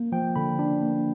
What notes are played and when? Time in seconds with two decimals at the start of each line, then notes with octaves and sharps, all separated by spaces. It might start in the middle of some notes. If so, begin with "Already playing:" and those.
Already playing: A#3
0.12 F3 G5
0.36 D3 B5
0.59 D4
0.82 A#3